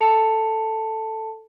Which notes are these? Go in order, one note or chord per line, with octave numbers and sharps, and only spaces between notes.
A4 A5 C#7 F7